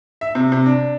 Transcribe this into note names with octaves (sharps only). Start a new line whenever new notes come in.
E5
C3
C3
D4